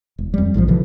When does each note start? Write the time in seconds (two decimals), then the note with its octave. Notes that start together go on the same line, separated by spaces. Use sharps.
0.19 E1
0.34 F2 G3
0.54 A#1 G#2 C3 F3
0.68 B2 D3 E3 F3